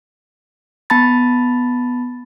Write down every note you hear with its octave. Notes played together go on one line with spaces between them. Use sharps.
B3 A5 B5 A6